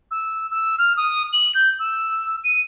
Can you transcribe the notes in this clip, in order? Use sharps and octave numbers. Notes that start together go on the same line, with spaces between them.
E6
E6
F6
D#6
F#7
G6
E6
D#7